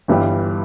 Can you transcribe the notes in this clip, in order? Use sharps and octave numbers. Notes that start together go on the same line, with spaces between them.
G1 G2 E3 G3